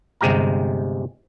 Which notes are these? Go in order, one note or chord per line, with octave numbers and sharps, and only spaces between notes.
G1 C3 G#3 G4 F5 A#5